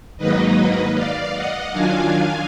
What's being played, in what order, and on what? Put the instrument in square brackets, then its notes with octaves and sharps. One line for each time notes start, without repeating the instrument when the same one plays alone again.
[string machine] G#2 D#3 F#3 A#3 D#4 B4 D#5
D5 F5
D#5 F#5
D#3 F#3 D4 F4 F5 G#5